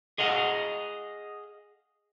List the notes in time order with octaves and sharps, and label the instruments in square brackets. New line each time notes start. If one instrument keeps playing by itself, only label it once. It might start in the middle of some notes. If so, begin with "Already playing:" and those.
[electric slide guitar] G#4 D#5 F5 F#5